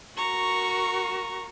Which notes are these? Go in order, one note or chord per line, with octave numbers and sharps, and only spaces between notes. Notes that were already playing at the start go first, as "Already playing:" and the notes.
F#4 A#4 A#5 C#6